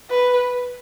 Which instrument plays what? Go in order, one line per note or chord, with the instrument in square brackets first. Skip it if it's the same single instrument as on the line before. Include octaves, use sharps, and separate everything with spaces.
[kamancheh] B4